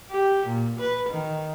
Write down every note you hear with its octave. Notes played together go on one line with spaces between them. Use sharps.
G4
A#2
B4
D#3